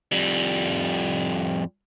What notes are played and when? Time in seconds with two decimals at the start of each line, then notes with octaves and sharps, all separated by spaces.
0.12 F2 G3